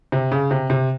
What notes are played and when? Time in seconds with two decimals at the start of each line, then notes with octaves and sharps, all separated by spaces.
0.12 C3
0.32 C#3
0.51 C3
0.70 C3